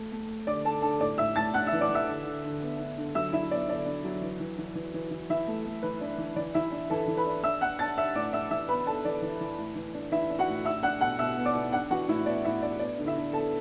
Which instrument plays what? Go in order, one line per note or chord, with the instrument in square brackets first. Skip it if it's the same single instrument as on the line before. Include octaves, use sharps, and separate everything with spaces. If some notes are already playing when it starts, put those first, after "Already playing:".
Already playing: [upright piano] A3
A3
A3
D3 D5 D6
D4 A4 A5
D3 A4 A5
A2 D5 D6
A2 E5 E6
A2 A5 A6
D4 F#5 F#6
E5 E6
E3
D5 D6
E3
E5 E6
D3
D3
D3
B3
D3
D3
F#3 E5 E6
D4 E4 E5
B3 D5
D3 D5
D4
F#3
E3
E3
E3
E3
E3
E3
E3 E4 E5
A3
A3
E3 B4
D4
E3
E3 D5
E3 E4 E5
D4
E3 A4 A5
E3
B4 B5
D4
D4 E5 E6
D4 F#5 F#6
D4 A5 A6
D4 E5 E6
A2 D5 D6
D4 E5 E6
E3 E5 E6
B3 B4 B5
D4 A4 A5
E3 D5
E3
E3
A2
E3
D4
E3 E4 E5
D4
F#4 F#5
A2
D4 E5 E6
D4 F#5 F#6
B2 F#5 F#6
B2 E5 E6
B3
D5 D6
B2
D4 F#5 F#6
E3 F#4 F#5
A2 E4 E5
B3 D5
A2 E4 E5
D4 D5
B3 D5
D3
E4 E5
D3
B3 A4 A5